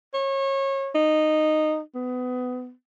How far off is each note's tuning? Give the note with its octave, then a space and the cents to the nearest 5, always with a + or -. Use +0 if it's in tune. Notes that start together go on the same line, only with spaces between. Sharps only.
C#5 -30
D#4 -10
B3 +25